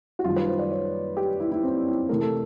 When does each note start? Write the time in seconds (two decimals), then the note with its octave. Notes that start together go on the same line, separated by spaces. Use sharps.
0.19 F#4
0.24 F#2 D#3 G3 F4
0.36 B4
0.47 C5
0.59 D5
0.71 C#5
1.17 G4
1.40 E4
1.51 E4
1.63 C4
1.86 E4
2.09 C3 E3 A3 A#4
2.21 A4